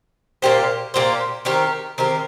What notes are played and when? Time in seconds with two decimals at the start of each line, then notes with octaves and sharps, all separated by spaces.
0.42 A#2 A#3 G4 C5
0.94 A#2 A#3 G4 C5
1.45 D#3 C4 G4 A#4
1.98 D#3 C4 G4 A#4